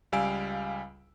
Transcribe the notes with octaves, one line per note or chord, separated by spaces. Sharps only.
C#2 G3 F5 G#5 E6 D7